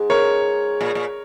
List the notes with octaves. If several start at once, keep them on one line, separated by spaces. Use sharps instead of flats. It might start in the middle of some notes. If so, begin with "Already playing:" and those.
Already playing: G#2
A#4 C#5
A#2
A#2